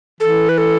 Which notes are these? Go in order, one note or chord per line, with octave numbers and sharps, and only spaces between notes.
E3 A4
B4
A4